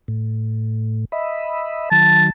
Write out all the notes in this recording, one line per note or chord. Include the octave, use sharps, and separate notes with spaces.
A2
D#5 E5 B5
D#3 F#3 A5